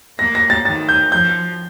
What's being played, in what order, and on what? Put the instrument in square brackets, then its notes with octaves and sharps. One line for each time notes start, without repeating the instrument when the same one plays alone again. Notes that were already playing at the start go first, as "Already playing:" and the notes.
[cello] A#3 [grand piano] A#6
[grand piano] A#6
A6
[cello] D#3 [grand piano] A6
[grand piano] G6
[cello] F3 [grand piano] G6